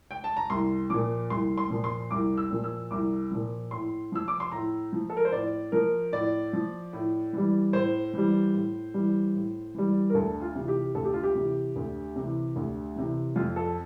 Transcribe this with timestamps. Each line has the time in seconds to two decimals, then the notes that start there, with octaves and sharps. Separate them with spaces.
0.11 G5
0.24 A5
0.37 A#5
0.50 C2 C6
0.90 A#2 F3 D6
1.30 C2 C6
1.58 C6
1.70 A#2 F3
1.84 C6
2.11 C2 D6
2.38 E6
2.51 A#2 F3
2.64 E6
2.91 C2 D6
3.32 A#2 F3
3.71 A2 C6
4.12 F3 E6
4.28 D6
4.40 C6
4.52 A2 A#5
4.93 F3
5.10 A4
5.17 A#4
5.25 C5
5.32 A2 D5
5.72 F3 A#4
6.12 A2 D5
6.53 F3
6.93 A2
7.33 E3 G3
7.73 A2 C5
8.14 E3 G3
8.53 A2
8.94 E3 G3
9.35 A2
9.75 E3 G3
10.10 A#4
10.14 D2 A4
10.42 F4
10.55 C3 E3
10.68 G4
10.95 D2 A4
11.05 G4
11.14 F4
11.23 G4
11.35 C3 E3
11.76 D2
12.16 C3 E3
12.56 D2
12.96 C3 E3
13.36 F2 F4
13.56 A4